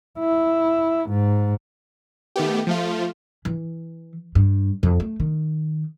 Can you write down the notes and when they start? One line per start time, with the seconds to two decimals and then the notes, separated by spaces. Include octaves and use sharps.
0.19 E4
1.09 G#2
2.36 D#3 A3 B3 G4
2.67 F3 A3 F4
3.45 E3
4.35 G2
4.83 F2
5.00 A3
5.20 D#3